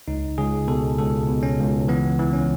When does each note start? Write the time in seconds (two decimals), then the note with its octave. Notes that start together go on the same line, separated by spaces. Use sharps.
0.08 C#2 D#4
0.38 C#2 G#4
0.67 B2 A4
0.98 C#2 A4
1.28 B2
1.43 C#4
1.59 C#2
1.88 E3 B3
2.19 E3
2.33 C#4